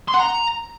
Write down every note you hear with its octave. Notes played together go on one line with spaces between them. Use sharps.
C6
F#5
A#5